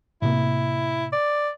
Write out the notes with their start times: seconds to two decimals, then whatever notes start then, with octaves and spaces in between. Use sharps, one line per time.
0.22 A2 C3 A#3 E4
1.12 D5